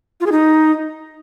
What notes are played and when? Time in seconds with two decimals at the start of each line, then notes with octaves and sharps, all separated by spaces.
0.21 F4
0.26 G#4
0.32 D#4